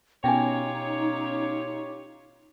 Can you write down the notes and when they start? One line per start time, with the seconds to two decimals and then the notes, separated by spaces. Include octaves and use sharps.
0.24 B2 C#4 D#4 F4 G4 C#5 G5 G#5